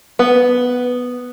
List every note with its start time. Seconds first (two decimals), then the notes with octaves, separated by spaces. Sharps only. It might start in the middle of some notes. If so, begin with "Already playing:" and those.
0.19 B3